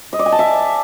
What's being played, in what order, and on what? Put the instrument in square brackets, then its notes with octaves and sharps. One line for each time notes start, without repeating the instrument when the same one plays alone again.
[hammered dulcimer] D#5
D5
G#5
A5
E5